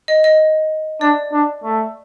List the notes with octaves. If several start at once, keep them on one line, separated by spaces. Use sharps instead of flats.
D#5
D#5
D4 D5
D4
A3